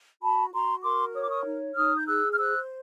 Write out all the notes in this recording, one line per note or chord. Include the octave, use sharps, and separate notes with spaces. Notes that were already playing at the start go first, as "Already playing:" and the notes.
F#4 A5 B5
F#4 A#5 C6
A#4 C6 D6
C#5 D#6
D6
C#6 D#6
D#4
D#4 D#6 F6
G6
G#4 E6 F#6
F6
C5 E6 F#6